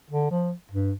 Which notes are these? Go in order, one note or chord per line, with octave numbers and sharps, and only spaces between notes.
D3
F3
G2